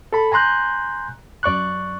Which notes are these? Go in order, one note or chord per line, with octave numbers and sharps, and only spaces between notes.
A4 B5
G#5 A#5 C6 F#6 G6
F#2 D5 C#6 F#6